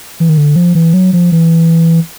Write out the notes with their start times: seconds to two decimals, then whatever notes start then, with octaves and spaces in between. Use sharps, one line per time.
0.20 E3
0.29 D#3
0.38 D3
0.56 F3
0.75 E3
0.94 F#3
1.13 F3
1.32 E3